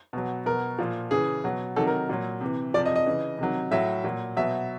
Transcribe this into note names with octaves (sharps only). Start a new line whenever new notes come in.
B2 F#3
B2 F#3 A#4
A#2 F3
C#3 E3 G#4
B2 F#3
C3 D#3 F#3 A4
A#4
A#2 F#3
C3 E3
C3 F3 D5
D#5
D#5
C#3 E3
C3 D#3 F#3
A2 F#3 E5
A#2 F#3
B2 F#3 E5